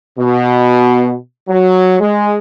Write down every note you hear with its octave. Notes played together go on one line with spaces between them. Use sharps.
B2
F#3
G#3